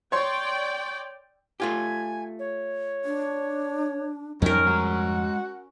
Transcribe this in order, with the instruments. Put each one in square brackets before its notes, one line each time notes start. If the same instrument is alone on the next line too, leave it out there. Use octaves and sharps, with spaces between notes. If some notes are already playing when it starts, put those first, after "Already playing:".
[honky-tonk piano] C#5 C6 [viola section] D5 G5
[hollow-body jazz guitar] A3 F4 G4 [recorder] G#5
[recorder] C#5
[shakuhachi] D4
[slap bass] F2 G3 [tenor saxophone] D#3 [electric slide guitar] F#3 C4 [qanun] C#4 A#4
[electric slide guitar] G#3 A#5 [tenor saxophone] F#4